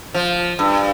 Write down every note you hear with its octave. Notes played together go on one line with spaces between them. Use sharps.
F3
G2